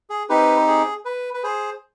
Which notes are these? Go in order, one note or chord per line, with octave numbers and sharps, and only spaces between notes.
G#4
C4 D#4 G4 B4
G#4
B4
B4
G#4 C5